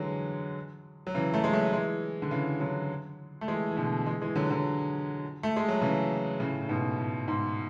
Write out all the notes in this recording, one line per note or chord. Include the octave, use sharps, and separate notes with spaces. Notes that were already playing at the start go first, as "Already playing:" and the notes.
Already playing: D3 E3 F#3 G#3
F#3
C#3 E3
F#3 A3
G#3
F#3 A3
E3 G#3
D3
C#3 E3
D3 F#3
A3
E3 G#3
E3
B2 D3
E3 G#3
E3 G#3
D3 F#3
D3 F#3
A3
G#3
F#3
C#3 E3
A2 C#3
A2
G#2 B2
A2
G#2